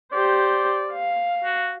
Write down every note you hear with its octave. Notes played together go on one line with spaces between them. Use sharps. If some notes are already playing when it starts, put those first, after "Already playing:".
G4 C5 D5
F5
F#4